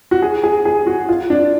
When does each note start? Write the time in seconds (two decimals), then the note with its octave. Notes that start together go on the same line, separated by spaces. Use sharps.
0.11 F#4
0.22 G#4
0.44 G#4
0.65 G#4
0.87 F#4
1.09 F4
1.30 D4